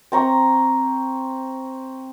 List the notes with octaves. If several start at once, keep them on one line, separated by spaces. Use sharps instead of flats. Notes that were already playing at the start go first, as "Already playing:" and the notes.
C4 A#5 C#6